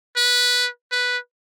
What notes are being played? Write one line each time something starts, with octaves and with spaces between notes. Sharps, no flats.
B4
B4